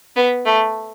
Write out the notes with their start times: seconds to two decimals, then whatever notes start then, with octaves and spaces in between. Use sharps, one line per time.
0.16 B3
0.46 A3